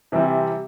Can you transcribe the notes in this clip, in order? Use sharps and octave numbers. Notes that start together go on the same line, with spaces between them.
C3 E3 G3 C4